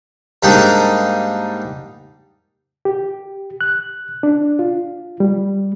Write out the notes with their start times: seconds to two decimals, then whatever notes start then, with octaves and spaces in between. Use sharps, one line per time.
0.43 G#2 G3 A#3 D4 D#4
2.85 G4
3.61 F#6
4.23 D4
4.59 F4
5.20 G3